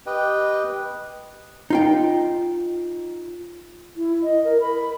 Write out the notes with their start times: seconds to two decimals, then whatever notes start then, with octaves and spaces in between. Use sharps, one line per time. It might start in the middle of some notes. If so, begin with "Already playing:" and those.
0.06 G4 B4 D#5 G5
1.70 D#4 F4 G5
3.95 E4
4.23 D#5
4.44 A#4
4.60 B5